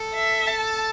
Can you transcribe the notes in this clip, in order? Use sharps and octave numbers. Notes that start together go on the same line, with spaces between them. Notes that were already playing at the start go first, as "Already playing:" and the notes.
Already playing: A4
E5
A5